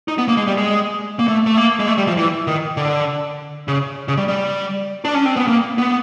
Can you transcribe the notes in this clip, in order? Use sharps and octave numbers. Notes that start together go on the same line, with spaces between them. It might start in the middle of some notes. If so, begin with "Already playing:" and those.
D#4
B3
A#3
G#3
G3
G#3
A#3
A3
A3
A#3
G#3
A3
G3
F3
E3
D#3
D3
C#3
C#3
G3
G3
D4
C#4
C4
B3
A#3
B3